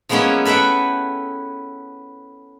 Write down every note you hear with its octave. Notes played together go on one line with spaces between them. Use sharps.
F3 G#3 A#3 B3 C#4 E4
A4 B4 E5 F#5 G5